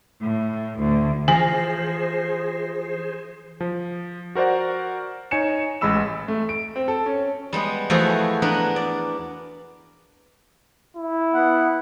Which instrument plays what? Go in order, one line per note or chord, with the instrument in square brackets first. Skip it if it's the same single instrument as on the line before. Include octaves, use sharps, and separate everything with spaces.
[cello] A2
D2
[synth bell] E3 A#6 C7 [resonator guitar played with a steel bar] F3 [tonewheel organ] G#4 C5 [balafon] G#5
[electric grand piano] F3
F#4 A#4 C5 D5 F#5
D#4 C#5 G#5 C#7 E7
A1 G#3 B5 E6 E7
[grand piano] A3
D7
C4
A4
C#4
[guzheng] G3 G#3 B3
E2 F3 A3 F#4 G#4 E5
B3 D4 A#4 B4
D5
[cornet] E4
[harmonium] B3 F#5